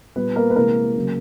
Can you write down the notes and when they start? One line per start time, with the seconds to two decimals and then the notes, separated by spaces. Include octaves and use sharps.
0.16 A#2 G3 B3 B4
0.36 A#3 A#4
0.50 B4
0.56 C3 E3 G#3 A#3 A#4
0.96 C#3 F#3